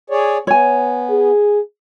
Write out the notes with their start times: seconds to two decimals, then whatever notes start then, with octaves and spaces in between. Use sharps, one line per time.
0.10 G#4 C#5 D5
0.47 B3 C#5 G#5
1.11 G#4